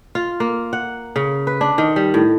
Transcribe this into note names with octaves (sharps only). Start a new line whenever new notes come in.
F4
A#3
F#5
C#3
B4
D4
D#3
G3
A2